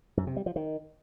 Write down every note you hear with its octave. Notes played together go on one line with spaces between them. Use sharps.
F#2
C3
G3
F3
D#3